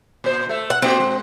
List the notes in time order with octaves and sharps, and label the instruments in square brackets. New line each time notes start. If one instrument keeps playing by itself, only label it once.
[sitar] A#2 C5
A3 E5
[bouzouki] F#5
[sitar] A3 A#3 F#4 [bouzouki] C4
[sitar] G#3